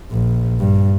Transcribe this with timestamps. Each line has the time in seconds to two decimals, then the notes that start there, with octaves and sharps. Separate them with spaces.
0.10 A#1
0.60 G2